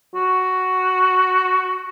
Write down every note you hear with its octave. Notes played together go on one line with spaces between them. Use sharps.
F#4